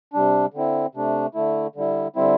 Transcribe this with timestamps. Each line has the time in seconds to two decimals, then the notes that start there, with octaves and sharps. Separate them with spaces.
0.13 C3 G3 D4
0.54 D3 C4 E4
0.95 C3 A3 D4
1.34 D3 A3 E4
1.76 D3 G3 E4
2.16 D3 G3 C4 E4